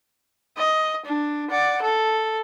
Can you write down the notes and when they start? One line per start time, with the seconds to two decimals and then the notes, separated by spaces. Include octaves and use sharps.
0.57 D#5
1.05 D4
1.50 D5 F#5
1.82 A4